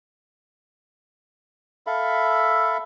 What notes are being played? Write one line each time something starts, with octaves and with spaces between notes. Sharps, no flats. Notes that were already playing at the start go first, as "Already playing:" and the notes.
A4 E5 F5 B5